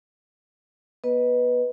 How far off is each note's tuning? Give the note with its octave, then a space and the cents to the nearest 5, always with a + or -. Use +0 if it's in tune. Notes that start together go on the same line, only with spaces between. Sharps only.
B3 -35 B4 +0 D#5 +0